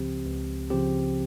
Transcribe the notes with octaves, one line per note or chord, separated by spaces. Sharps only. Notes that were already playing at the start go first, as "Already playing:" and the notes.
Already playing: C#2 C#3 F3 C4 G4
C#2
C#3 F3 C4 G4